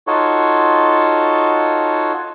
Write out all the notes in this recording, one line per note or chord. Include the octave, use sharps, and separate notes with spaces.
D#4 F4 F#4 A4 C#5